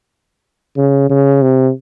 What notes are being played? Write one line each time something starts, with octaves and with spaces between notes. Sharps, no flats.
C#3
C#3
C3